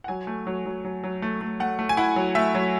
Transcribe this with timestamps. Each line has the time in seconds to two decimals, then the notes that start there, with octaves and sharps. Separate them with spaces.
0.04 F#5
0.08 F#3 G#5
0.27 A3
0.47 F#3
0.66 F#3
0.85 F#3
1.04 F#3
1.22 A3
1.41 A3
1.60 A3 F#5
1.79 A3
1.89 G#5
1.97 E4 F#5
2.16 F#3
2.35 A3 E5
2.55 F#3